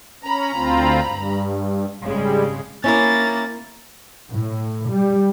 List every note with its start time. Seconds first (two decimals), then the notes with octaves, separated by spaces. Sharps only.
0.23 C#4 A#5 B5
0.53 D2 C4 F4
1.04 G2
2.03 G#1 C#3 G3 G#3
2.84 A#3 C#4 E4 A#4 A6
4.32 A2
4.89 G3